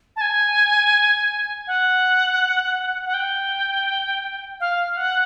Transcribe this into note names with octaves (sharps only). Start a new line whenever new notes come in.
A5
G#5
F#5
F#5
G5
F5
F#5